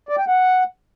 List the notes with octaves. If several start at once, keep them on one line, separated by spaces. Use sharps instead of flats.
D5
G5
F#5